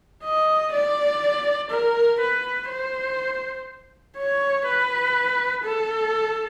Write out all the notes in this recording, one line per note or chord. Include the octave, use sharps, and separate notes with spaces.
D#5
D5
A#4
B4
C5
C#5
B4
A4